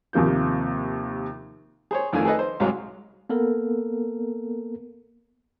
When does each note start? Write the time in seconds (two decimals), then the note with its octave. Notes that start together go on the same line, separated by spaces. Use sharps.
0.13 D#2 C3 F3 A#3 G6
1.91 G#4 C5 C#5
2.13 F2 D#3 A3 D4 F4 G#5
2.25 G#4 A4 B4 D#5
2.39 C5
2.60 C2 G#2 F#3 G#3 F5
3.29 A#3 B3 A4 A#4